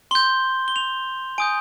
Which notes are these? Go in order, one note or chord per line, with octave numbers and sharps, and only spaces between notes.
C6 G6 G7
G7
F7
G#5 D#6 G6 D7